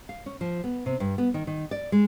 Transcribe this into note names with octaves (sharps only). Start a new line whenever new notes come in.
F5
C#4
F3
B3
C3
G2
B3
D#3
D#3
D5
G#3